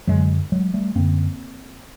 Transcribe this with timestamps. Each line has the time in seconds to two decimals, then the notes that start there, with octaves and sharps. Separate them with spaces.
0.07 F#2 D3 F#3 G#3
0.52 F#3 G#3
0.74 G3 A3
0.95 F#2 D3 A#3 C4